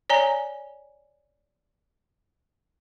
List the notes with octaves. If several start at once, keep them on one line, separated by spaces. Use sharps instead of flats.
C#5 D5 G#5 A#5